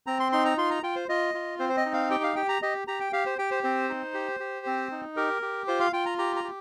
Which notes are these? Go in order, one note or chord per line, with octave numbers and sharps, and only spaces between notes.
C4 A#5
C6
D#4 C6
A#5
F4 C6
A#5
F4 G5
C5
F4 D#5
F4
C4 C5
C5
D#5
D#4
F5
G4 G5
F5
G4 G5
A#5
G4 D#5
G4 A#5
G5
G4 F5
C5
G4 G5
C5
C4 C5
D#4
G4
G4
C4
D#4
G4 A#4
G4
F4 C5
F5
F4 G5
A#5
G4 A#5
A#5
G4